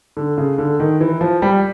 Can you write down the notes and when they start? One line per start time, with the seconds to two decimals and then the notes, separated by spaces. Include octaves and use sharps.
0.17 D3
0.38 C#3
0.58 D3
0.80 D#3
1.01 E3
1.21 F3
1.42 G3